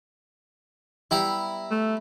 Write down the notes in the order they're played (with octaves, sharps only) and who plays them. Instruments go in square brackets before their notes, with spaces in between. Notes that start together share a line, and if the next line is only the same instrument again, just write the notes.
[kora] G3 B3 G4 [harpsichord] E4 A#5
[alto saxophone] A3